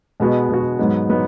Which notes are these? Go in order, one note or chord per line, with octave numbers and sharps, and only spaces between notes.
B2 G#3 B3 F#4
B2 G#3 B3 F#4
G#2 F#3 B3 D#4
F#3 B3 D#4